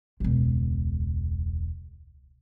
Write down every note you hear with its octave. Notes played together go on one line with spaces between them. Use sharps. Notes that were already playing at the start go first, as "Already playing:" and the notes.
E1 C#2